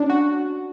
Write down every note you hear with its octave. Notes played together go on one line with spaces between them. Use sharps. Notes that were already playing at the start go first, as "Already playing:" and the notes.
Already playing: C#4 D4
F#4